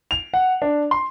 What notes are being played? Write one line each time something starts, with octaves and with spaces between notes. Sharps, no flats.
F7
F#5
D4
C6